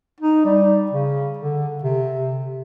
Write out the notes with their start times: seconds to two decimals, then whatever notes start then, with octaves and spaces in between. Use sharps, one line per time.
0.20 D#4
0.45 G3
0.91 C#3
1.38 D3
1.83 C3